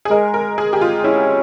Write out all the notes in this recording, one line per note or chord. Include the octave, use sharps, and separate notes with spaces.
G#4
G#3 A#4
A#4
G#3 G#4
G4
F4
C#4 E4